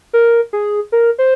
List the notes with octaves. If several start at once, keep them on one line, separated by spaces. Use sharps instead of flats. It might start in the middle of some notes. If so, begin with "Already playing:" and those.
A#4
G#4
A#4
C5